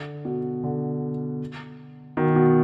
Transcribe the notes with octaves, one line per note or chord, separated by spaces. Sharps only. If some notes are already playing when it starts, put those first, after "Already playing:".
Already playing: D3
B2
D3
B2 D#3
B2